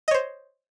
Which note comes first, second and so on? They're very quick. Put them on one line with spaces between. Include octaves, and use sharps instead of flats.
D#5 C#5 C5